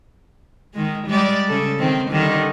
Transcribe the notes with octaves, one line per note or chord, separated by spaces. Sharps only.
D#3 G#3
G3 G#3 D5
C#3 A4
D#3 C4
D3 D#3 G3